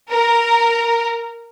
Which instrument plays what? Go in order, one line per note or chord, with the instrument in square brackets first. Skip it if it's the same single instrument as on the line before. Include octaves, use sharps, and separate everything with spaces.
[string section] A#4